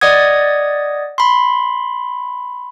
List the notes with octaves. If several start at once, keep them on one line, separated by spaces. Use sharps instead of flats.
D5 D#5 F#5 D#6 G#6
B5 C6